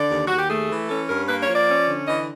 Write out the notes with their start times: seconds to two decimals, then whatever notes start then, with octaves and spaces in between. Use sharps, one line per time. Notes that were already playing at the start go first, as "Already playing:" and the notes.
Already playing: D3 D5
0.11 D#2
0.27 D#2 F#4
0.39 G4
0.50 A3 G#4
0.70 E3
0.89 C#4 A4
1.09 G2 A#4
1.29 A#3 B4
1.42 C#5
1.48 F3
1.56 D5
1.68 C#4
1.88 D3
2.08 E3 D#5